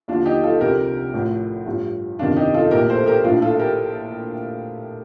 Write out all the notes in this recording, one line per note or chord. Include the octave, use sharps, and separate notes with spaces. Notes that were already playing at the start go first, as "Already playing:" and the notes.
D#2 D3 F3 D4 F4
D#4 G4
F4 A4
C2 C3 F3 G4 A#4
A1 A2 F3
A1 G2 F3
G1 F2 C3 D#3 D4 F4
D#4 G4
F4 A4
A#1 A2 F3 G4 A#4
A4 C5
G4 A#4
A#1 A2 F3 D4 F4
F4 A4
G4 A#4